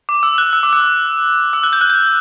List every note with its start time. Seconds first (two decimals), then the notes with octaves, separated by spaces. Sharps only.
0.09 D6
0.23 E6
0.38 F#6
0.53 E6
0.63 D6
0.73 E6
1.53 E6
1.64 F#6
1.73 G6
1.81 F#6
1.90 G6